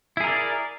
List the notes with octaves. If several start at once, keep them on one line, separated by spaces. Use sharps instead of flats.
E4 G#4 A#4 D5